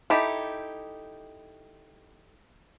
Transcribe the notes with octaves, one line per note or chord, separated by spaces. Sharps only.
D#4 E4 G4 A4